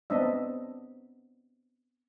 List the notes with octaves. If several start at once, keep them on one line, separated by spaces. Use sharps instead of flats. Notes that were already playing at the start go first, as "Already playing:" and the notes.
B3 C4 D4 D#5 E5